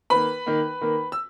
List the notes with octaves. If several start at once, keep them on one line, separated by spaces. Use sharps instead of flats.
D#3 A#3 B4 B5
D#3 A#3
D#3 A#3
E6